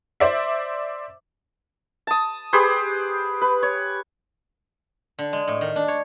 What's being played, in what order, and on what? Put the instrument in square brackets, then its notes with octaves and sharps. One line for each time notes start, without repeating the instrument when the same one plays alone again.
[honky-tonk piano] C5 D5 E5
[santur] A5 D#6
G4 G#4 B4 C5
B4
C#5
[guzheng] D3
G#3
A2
D#3
D4
C#5